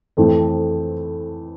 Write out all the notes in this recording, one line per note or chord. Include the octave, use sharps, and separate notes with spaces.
F2 E3 A3 C4